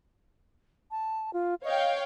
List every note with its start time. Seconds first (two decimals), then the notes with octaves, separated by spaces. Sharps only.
0.91 A5
1.33 F4
1.64 C#5 D#5 F5 G5